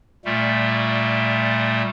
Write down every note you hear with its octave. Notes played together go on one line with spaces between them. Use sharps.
A#2 G3 A3